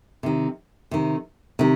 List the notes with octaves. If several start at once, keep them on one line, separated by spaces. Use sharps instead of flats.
C3 D#3
C3 D#3
C3 D#3